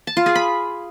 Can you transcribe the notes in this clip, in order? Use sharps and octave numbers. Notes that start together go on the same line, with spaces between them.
A5
F4
G#4
B5